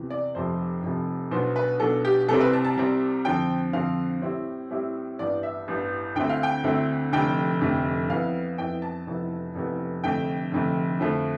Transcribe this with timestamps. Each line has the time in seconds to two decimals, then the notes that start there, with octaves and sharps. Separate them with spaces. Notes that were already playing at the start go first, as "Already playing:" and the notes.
Already playing: E2 C3 E3
0.10 D5
0.35 F1 F2 C3 F3 C5
0.83 F1 F2 C3 F3
1.31 B1 B2 B3 D4 C5
1.56 B4
1.80 B1 B2 B3 D4 A4
2.05 G4
2.28 C2 C3 G3 C4 A4
2.40 B4
2.53 A5
2.65 A5
2.77 C2 C3 G3 C4
3.25 F2 D3 F3 C4 G5
3.73 F2 D3 F3 C4 F5
4.22 A2 G3 C4 E4
4.70 A2 G3 C4 E4
5.19 A1 G2 E3 B3 D5
5.43 E5
5.68 A1 G2 E3 B3
6.15 D2 D3 A3 C4 E4 G5
6.29 F5
6.43 G5
6.64 D2 D3 A3 C4 E4
7.12 F1 F2 D3 A3 D4 G5
7.61 F1 F2 D3 A3 D4
8.10 F2 E3 B3 E4 F5
8.58 F2 E3 B3 E4 G5
8.82 A5
9.06 F1 F2 E3 B3 E4
9.55 F1 F2 E3 B3 E4
10.03 F1 F2 D3 A3 G5
10.51 F1 F2 D3 A3
11.00 F2 D3 F3 A3